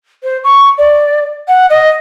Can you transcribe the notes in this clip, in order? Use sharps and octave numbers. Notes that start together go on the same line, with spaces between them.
C5
C#6
D5
F#5
D#5